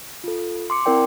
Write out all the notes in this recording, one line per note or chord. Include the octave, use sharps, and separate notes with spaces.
F4 A4
C6 D6 C#7
C4 E4 A#4 D5 G5